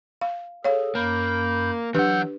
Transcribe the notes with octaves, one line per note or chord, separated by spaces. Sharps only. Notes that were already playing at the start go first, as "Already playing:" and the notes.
F5
G#4 A4 C#5 F5
F#2 A#3 B5 G6
E3 F#3 D4 G4 B4 F#5 E6 G6